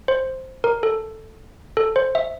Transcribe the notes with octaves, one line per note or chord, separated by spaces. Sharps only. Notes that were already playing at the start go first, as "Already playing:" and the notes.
C5
A#4
A4
A4
C5
E5